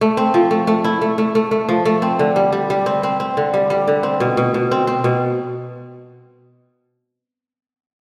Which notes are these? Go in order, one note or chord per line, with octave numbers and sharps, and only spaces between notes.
A3
C4
F3
A3
A3
E4
A3
A3
A3
A3
F3
A3
C4
D3
G3
G3
G3
C4
C4
C4
D3
G3
G3
D3
C4
B2
B2
B2
C4
C4
B2